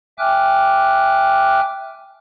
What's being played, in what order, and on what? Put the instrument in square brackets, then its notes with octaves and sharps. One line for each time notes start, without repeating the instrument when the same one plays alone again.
[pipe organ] E5 G5 G#5 D6 F6 F#6